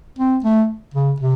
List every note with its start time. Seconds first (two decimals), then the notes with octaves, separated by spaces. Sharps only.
0.19 C4
0.44 A3
0.94 C#3
1.20 C3